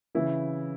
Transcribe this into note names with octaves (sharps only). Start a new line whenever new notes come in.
C#3 E3 E4